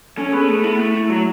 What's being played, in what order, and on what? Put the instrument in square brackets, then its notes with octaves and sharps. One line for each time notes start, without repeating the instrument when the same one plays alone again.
[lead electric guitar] C#4 [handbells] A4
[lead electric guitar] B3 [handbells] G#4
[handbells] A4
[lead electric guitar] A3 [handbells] G#4
[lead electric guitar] B3 [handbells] E4
[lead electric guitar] A3 [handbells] E4
[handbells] E4
[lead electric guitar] F#3 [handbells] F#4